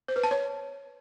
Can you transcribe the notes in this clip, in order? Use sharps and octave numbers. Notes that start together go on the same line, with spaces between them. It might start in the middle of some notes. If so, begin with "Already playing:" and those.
C5
B4
A5
C#5